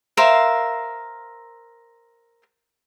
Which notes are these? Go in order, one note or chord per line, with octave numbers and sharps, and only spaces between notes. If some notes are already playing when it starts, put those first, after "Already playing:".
A#4 C5 E5 F5